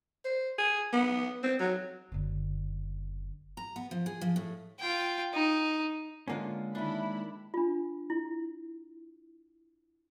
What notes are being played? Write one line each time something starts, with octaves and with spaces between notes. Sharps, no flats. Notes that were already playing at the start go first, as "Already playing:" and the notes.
C5
G#4
B3
C4
F#3
F#1 D3
A#5
B3
F3
G#4
F3
A2
F4 G5
D#4
D3 G#3 A#3 C#4 F4
D#3 D4 E4 B5
D4 F4
E4